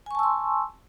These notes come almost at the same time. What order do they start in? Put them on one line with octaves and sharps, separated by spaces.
G#5 C#6 A5 E6 C6